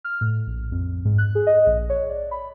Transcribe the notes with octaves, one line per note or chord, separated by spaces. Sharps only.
F6
A2
A#1
F2
G#2
F#6
G#4
D#5
A#1
C#5
D5
B5